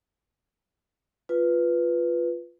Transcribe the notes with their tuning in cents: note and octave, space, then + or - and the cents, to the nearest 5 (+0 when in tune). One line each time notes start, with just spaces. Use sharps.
F4 +0 B4 +0